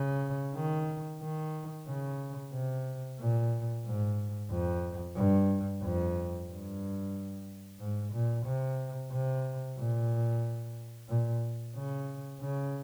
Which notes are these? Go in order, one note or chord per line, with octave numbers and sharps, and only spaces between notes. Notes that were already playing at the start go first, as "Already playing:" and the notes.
Already playing: C#3
D#3
D#3
C#3
C3
A#2
G#2
F2
G2
F2
G2
G#2
A#2
C3
C3
A#2
A#2
C#3
C#3